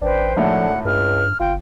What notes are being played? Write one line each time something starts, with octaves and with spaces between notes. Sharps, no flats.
A1 D4 B4 C5 G5
G#1 A2 D3 F3 F#5
C#2 G2 F6
G1 F4 G5